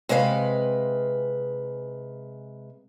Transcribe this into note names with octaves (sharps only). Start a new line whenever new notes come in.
C3 G#3 B4 C5 F5